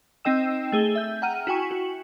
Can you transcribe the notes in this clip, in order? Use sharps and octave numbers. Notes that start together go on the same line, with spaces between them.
C4 D#4 D#5 G5 E6 E7
A3 G#4 E6 G7
E5 G6
F#5 G5 A#5 F6 D#7
E4 F#4 G5 G#5 C#6
F#4